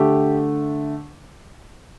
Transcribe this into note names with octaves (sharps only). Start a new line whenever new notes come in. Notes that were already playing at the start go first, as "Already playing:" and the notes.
Already playing: D3 A3 G4